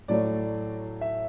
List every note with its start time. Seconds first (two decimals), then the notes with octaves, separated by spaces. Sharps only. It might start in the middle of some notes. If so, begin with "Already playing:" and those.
0.08 A2 F#3 A3 D5
1.01 E5